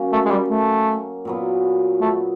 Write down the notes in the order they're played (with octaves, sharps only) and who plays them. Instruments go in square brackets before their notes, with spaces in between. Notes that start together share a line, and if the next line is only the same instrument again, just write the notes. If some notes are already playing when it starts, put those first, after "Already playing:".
Already playing: [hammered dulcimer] F#3 A#3 C#4
[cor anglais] A3
G#3
G3
A3
[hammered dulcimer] A#2 F#3 B3
[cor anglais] A3